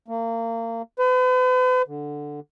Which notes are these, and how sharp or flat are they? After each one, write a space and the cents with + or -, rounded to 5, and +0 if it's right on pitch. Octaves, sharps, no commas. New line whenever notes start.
A#3 -30
B4 +45
D3 +0